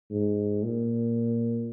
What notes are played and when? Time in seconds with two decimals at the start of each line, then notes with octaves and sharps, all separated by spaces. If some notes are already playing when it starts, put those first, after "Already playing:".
0.11 G#2
0.63 A#2